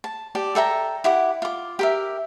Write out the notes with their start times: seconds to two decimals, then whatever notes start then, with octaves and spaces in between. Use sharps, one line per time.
0.04 A5
0.35 G4 D5 A5
0.55 A4 E5 G5 A#5
1.04 E4 G4 F#5 D6
1.42 F4 D6
1.79 G4 A#4 E5